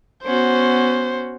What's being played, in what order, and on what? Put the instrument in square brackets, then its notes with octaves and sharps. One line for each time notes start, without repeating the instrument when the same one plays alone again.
[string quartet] B3 C#4 F#4 [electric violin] C5